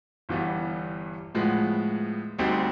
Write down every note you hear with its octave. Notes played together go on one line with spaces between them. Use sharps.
G1 G2 E3 G3 B3
A2 F3 G#3 B3
D2 D3 G3 C4 D#4